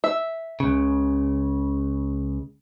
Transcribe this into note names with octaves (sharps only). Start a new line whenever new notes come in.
E5
C#2 C#3